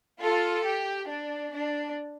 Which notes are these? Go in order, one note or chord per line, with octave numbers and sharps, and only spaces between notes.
F4 A4
G4
D4
D4